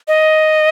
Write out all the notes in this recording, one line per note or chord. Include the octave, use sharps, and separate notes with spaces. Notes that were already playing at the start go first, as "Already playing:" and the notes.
D#5